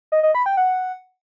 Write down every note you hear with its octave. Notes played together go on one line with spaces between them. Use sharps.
D#5
D#5
B5
G5
F#5